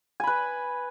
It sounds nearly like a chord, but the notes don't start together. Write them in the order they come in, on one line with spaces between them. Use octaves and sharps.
G#5 B5 B4